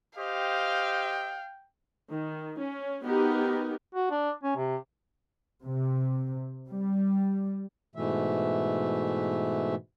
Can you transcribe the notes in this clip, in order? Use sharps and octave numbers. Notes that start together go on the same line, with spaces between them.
G4 C5 D#5 F5 G5
D#3
C#4
B3 D#4 F#4 G4 A#4
F#4
D4
C#4
C3
C3
G3
G#2 B2 E3 A3 E5